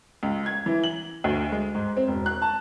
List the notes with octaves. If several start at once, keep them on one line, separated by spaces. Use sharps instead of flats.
C#2
G#6
E3
F#7
D2
G#3
G#2
C4
E1
F#6
A5